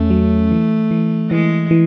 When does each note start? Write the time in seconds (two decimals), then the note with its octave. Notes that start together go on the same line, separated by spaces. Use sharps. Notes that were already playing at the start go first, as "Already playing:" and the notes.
Already playing: E2 A3 C#4
0.10 F#3
0.51 E3
0.91 E3
1.30 E3 G#3
1.71 E3